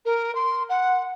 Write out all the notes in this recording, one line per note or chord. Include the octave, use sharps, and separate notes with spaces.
A#4
C6
F#5